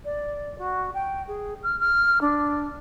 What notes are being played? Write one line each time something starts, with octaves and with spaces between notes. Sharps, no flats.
D5
F#4
G5
G#4
F6
F6
D4